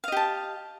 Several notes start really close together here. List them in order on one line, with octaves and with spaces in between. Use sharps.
F5 D#5 G4 A5